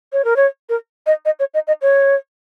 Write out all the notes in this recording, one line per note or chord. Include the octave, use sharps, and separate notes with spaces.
C#5
A#4
C#5
A#4
D#5
D#5
C#5
D#5
D#5
C#5